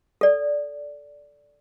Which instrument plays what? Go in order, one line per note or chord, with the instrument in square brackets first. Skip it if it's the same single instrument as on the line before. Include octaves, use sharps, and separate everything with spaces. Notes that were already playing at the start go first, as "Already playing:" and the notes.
[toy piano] A4 D5